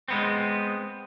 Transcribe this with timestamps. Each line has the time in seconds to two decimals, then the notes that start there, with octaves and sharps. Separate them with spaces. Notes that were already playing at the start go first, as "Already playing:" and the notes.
0.08 G#3 B3 C4